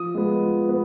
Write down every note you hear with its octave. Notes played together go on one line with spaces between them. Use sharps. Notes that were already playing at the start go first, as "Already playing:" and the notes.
Already playing: F3 D#6
G#3 B3
F3
B3